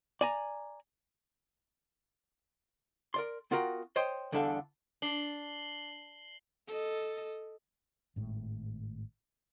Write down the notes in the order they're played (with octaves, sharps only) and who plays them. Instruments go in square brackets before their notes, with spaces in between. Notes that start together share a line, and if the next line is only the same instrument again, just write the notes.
[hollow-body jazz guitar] D5 G#5 A#5
A#4 D5 C6
B3 F4 F#4 A#4 G5
C5 C#5 D#5 G5 C6
E2 D3 G3 D4 A4 F5
[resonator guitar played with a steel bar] D4 [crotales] C7 F#7 G7
[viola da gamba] A4 D#5
[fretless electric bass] G#1 A2 G#3